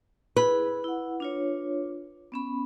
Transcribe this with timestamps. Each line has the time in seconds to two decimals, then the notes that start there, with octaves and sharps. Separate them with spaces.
0.36 E4 G#4 B4
0.84 E4 F#5
1.20 D4 F4 C#5
2.32 B3 C#4 B5